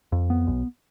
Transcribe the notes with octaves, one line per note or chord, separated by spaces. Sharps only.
F2
B3
B1